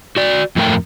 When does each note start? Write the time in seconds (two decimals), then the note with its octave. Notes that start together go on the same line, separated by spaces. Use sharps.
0.16 F#4 D5
0.56 F2 A2 A3 A#4 G5